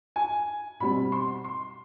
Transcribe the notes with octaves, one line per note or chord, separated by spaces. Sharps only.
G#5
B2 G3 C4 B5
C6
C6